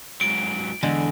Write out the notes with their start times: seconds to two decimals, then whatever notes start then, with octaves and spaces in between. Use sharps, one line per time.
0.21 G#2 F#3 D7
0.83 E2 D3 G#3